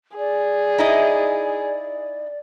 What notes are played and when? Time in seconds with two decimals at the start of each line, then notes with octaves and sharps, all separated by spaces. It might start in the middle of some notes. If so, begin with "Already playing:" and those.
0.17 G#4 D5
0.78 D#4 E4 D#5